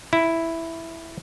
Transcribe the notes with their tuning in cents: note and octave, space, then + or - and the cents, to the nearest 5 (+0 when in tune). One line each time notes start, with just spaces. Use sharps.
E4 +0